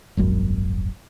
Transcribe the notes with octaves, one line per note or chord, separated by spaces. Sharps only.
D#1 G#1 F#2